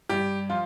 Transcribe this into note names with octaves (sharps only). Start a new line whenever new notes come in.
G2 G4
F3 F4